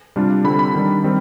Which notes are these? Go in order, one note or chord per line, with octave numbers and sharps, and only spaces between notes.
C3 G3 D4 F4
D3 G3 C4 B5
B5
D#3 G3 D4
D#3 G3 C4